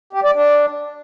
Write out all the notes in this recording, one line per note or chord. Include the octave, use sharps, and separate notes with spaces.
G4
D5
D4